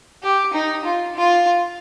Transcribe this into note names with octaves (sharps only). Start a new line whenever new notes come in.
G4
D#4
F4
F4